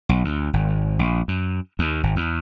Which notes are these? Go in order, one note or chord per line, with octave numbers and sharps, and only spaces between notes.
B1
D2
G#1
A#1
F#2
D#2
G#1
E2